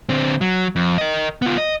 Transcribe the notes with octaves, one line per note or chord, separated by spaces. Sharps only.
D3 C4
F#3
F2
A#4 D#5
B3 F4
D#5